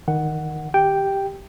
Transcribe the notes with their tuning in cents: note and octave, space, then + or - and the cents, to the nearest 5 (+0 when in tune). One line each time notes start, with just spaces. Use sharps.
D#3 +0 F#5 +5
G4 +0 G5 +0